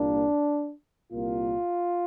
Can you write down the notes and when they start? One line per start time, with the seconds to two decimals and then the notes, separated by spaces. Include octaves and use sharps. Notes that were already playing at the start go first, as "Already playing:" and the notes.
Already playing: C2 A#2 A#3 D4
1.12 C2 A#2 A#3 F4